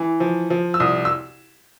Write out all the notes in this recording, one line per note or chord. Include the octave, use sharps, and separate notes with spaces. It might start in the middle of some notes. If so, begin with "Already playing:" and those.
Already playing: E3
F3
F3
E6
C2 D#6
E6